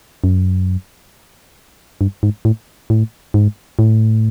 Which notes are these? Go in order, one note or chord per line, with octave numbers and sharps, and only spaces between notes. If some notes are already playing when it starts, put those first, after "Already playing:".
F#2
G2
G#2
A2
A2
G#2
A2